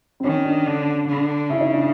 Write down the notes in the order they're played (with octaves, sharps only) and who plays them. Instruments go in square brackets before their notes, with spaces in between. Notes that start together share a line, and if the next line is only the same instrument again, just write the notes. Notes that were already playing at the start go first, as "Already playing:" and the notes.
[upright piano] C4
[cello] D#3 [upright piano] C#4
[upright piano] D4
[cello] D3
D3
[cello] C#3 [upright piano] E4
[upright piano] D#4
D4